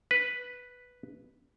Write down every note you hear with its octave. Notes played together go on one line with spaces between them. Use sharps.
B4